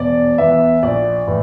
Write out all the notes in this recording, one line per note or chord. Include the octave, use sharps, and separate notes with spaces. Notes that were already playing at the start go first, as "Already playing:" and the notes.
Already playing: E1 D5
E2 E3 E5
A#1 D5
A2 E3